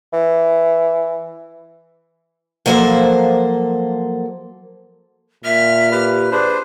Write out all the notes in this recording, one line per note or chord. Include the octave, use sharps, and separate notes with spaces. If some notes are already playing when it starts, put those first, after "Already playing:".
E3
F3 F#3 A#3 A4 C5
A#2 E5 F6
G4 B4
D4 G#4 B4 C5